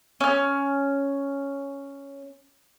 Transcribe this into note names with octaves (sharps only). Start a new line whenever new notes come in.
C#4 F6